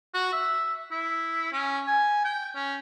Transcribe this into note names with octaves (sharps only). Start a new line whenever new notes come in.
F#4
E5
E4
C#4
G#5
G5
C#4